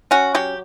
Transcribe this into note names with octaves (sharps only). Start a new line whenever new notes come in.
C#4 F#4
F#3 G4